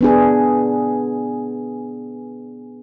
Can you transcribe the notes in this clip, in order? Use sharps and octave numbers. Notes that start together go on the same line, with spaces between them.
B3 D4 G#4